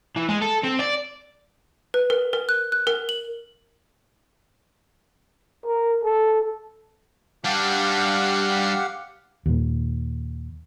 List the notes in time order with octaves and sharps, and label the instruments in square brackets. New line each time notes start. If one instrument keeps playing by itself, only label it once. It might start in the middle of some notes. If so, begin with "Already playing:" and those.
[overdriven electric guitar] E3
G#3
A4
C4
D5
[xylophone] B4
A#4
A#4
F#6
F#6
A#4
F#7
[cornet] A#4
A4
[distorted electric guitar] G3 D4 [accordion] G4 F5 F#5
[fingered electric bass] D#2 A#2